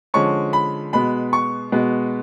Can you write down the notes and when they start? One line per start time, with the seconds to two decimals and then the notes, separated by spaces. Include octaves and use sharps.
0.14 D3 F3 G#3 C#4 C#6
0.53 B5
0.93 B2 G#3 B3 B5
1.33 C#6
1.72 B2 G#3 B3